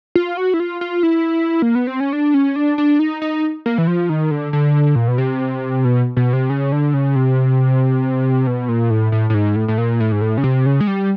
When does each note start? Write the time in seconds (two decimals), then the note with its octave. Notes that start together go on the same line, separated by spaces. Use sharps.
0.15 F4
0.37 F#4
0.54 E4
0.60 F4
0.81 F4
1.03 E4
1.62 A#3
1.75 B3
1.87 C4
2.00 C#4
2.13 D4
2.34 C#4
2.56 D4
2.78 D4
2.99 D#4
3.22 D#4
3.66 A#3
3.78 E3
3.87 F3
4.09 D#3
4.31 D3
4.53 D3
4.95 A#2
5.08 B2
5.18 C3
5.85 B2
6.17 B2
6.33 C3
6.50 C#3
6.72 D3
6.94 C#3
7.15 C3
8.47 B2
8.69 A#2
8.90 A2
9.12 A2
9.30 A2
9.34 G#2
9.56 A2
9.68 A2
9.78 A#2
10.00 A2
10.12 G#2
10.21 A2
10.38 C#3
10.44 C3
10.66 C#3
10.81 G#3
10.87 G3